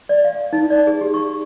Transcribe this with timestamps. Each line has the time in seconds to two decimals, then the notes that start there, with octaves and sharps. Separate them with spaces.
0.09 D5
0.25 F5
0.53 D#4
0.70 D5
0.87 G#4
1.01 G4
1.14 C#6